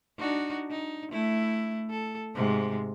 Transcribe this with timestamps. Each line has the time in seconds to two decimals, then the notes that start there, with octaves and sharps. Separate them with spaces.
0.19 D4 D#4 F#4
0.71 D#4
1.12 A3 E4
1.90 A4
2.35 G#2 C3 G#3